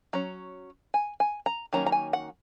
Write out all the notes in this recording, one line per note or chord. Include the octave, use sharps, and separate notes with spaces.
F#3 C#4 A#5
G#5
G#5
A#5
D#3 F#3 A#3 C#4 A#5
A#5
G#5
F#5